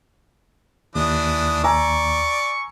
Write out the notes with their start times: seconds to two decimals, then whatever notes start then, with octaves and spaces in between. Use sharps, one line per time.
0.95 D#2 E3 D4 D#6
1.64 D5 G#5 A#5 C#6 E6